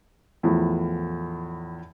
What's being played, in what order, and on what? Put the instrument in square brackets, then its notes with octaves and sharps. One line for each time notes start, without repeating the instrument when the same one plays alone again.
[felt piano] E2 A2 F3